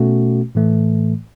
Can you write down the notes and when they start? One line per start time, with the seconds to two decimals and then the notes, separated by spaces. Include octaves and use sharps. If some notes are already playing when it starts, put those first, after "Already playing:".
Already playing: B2 A3 C#4 F#4
0.55 A2 E3 A3